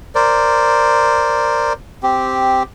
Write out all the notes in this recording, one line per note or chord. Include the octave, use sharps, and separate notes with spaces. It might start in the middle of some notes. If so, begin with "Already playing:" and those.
A#4 C5 D5
C4 G4